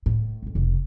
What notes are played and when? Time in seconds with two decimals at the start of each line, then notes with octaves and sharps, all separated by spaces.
0.06 A2
0.42 A1 F2
0.55 F1 C3